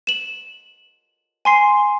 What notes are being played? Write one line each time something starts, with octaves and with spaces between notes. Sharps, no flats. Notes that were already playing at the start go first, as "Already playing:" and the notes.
E7 F#7
G#5 C6 C7